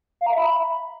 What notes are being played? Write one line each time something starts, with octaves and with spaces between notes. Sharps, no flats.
F5
A#5
E5
B5